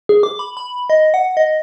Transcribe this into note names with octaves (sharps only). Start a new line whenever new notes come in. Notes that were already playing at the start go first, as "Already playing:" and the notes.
G#4
D6
B5
B5
D#5
F#5
D#5